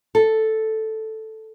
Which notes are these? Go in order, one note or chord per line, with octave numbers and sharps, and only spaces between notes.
A4